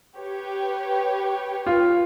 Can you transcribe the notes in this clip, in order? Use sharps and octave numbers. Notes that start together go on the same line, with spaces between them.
G4 B4 C#5
F4